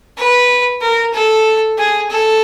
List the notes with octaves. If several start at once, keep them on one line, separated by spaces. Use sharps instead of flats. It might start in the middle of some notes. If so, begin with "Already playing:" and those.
B4
A#4
A4
G#4
A4